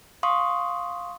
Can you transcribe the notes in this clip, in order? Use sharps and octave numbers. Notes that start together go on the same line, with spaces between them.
F5 C6 C#6 D#6